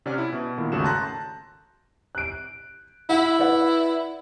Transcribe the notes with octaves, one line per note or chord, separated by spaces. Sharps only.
C3 C#4 D5 F#5 F6
E4
B2
A#2 D#3 E4
G#1 D#2 C#3 A3 F#4 E7
A5 A#5 C6 F#6 G6 A#6
F#6 D7
E4 F#5
B4 D5 F#5